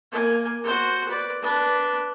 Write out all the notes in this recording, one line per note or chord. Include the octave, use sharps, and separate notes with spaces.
A#3 G#5
F#4 C5
B4 D5
D4 B4